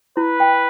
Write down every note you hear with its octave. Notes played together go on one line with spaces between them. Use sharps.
E4 B4
G5